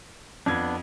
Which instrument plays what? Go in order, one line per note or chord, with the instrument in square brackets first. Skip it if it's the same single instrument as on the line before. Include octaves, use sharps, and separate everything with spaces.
[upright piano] F2 G#6 [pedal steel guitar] B3 D4